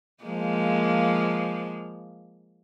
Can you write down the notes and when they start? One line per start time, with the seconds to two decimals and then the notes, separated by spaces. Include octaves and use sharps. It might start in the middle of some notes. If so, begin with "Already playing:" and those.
0.23 F3 G#3 A#3